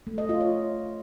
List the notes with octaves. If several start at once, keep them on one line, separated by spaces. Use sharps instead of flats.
A3
D#5
F4
C#5